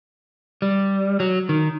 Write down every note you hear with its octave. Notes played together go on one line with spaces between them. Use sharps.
G3
F#3
D#3